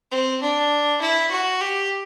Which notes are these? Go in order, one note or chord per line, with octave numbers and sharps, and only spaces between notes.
C4
D4
E4
F#4
G4